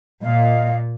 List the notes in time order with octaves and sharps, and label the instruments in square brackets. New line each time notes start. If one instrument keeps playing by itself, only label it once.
[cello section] A#2 [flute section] D#5 F5